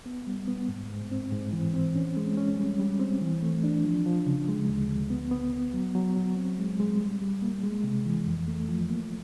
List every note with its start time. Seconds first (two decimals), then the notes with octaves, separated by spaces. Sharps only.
0.06 B3
0.27 G3
0.48 B3
0.69 G#2
0.90 G#2
1.11 C4
1.32 G#2
1.53 E3
1.74 C4
1.95 C#4
2.17 G#3
2.37 C#4
2.58 G3
2.80 G3
3.00 C4
3.21 E3
3.43 A3
3.64 D4
3.84 F3
4.06 F3
4.27 C#3
4.48 G#3
4.69 D2
4.90 D2
5.10 B3
5.31 B3
5.53 B3
5.73 F#3
5.95 F#3
6.16 F#3
6.36 C4
6.58 G#3
6.80 G#3
7.00 G3
7.22 G3
7.42 A#3
7.63 G#3
7.84 C3
8.05 E3
8.27 F2
8.48 A3
8.69 F3
8.90 A#3